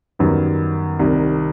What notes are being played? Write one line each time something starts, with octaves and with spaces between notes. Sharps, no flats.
F#2 D#3 G3 B3
C2 C3 D#3